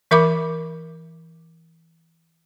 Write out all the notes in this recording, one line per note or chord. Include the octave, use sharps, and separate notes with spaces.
E3 A#4 E5 B5 D6